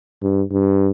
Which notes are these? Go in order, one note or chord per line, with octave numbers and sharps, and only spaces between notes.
G2
G2